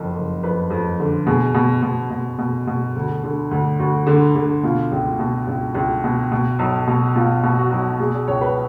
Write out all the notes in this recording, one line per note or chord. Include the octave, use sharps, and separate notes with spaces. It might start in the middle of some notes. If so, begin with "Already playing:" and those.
Already playing: F#1 F2 A4
F#1
F2 B4
F2
D3
B2 G#4
B2
B2
B2
B2
B2
D2
D3
D2
D2 F#4
D3
D3
B2 F4
C#2
B2
C#2
C#2
B2
B2
B1
B2
B2 F4
B2
F#4
B1
B2 G#4
D5
C#2 C#5
B4